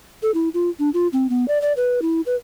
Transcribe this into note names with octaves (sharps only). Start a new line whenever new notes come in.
A4
E4
F4
D4
F4
C4
B3
D5
D5
B4
E4
B4